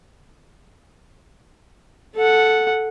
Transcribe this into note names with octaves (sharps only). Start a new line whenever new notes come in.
A4 F#5